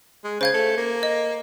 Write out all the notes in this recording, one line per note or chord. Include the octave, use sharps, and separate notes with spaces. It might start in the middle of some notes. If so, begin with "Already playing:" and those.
G#3
C#3 C5 F5 G#6
A3
A#3
D#5